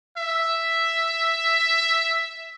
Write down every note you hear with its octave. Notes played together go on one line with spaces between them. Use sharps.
E5